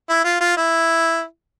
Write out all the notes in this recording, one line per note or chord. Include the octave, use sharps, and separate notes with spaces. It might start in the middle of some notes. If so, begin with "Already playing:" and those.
E4
F4
F4
E4